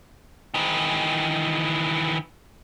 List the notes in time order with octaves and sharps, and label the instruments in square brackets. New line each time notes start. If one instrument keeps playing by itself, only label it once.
[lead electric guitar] D#3 E3